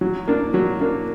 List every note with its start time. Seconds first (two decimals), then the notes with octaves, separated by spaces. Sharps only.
0.01 F#3
0.27 A#3 D4
0.54 F#3
0.81 A#3 D4